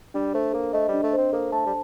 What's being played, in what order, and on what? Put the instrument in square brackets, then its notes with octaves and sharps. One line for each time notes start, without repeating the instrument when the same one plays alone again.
[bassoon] G3 [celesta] D4
[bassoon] A3 [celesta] C5
[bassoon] A#3 [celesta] A4
[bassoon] A3 [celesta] D#5
[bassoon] G3
[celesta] D4
[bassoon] A3
[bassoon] C4 [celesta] C5
[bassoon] A#3 [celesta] A4
[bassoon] A3 [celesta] A5
[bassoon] G3